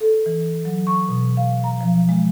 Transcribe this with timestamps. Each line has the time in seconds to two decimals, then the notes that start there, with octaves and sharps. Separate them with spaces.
0.01 A4
0.26 E3
0.65 F#3
0.87 C#6
1.09 B2
1.37 F5
1.64 A#5
1.81 F3
2.09 G#3